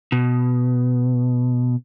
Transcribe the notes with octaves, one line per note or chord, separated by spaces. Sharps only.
B2